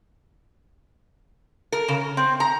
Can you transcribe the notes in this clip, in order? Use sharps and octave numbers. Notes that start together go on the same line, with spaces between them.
A#4
C#3
C4
A#5